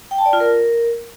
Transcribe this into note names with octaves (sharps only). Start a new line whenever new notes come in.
G5
A5
D5
F4
A#4